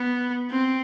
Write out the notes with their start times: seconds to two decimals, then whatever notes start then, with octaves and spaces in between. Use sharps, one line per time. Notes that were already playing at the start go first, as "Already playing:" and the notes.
Already playing: B3
0.51 C4